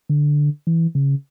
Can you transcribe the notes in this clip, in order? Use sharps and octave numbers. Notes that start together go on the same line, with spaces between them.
D3
E3
C#3